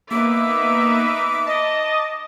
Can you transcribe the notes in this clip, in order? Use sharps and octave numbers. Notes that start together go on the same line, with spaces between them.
A#3 B3 D#4 B4 E5 D6
D#5 A5